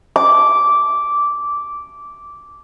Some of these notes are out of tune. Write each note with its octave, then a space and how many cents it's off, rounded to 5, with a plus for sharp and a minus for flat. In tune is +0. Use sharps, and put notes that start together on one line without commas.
D6 -10